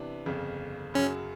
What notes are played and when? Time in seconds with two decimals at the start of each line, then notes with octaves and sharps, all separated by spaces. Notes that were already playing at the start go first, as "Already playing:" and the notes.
Already playing: C3 E3 B3 D4
0.26 G1 F2 C#3
0.94 F#2 C#3 F#3 C#4